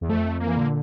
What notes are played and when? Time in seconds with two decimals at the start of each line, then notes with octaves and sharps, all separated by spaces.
0.01 E2
0.08 F2 A3
0.40 A#3
0.46 E3
0.55 A#2 D3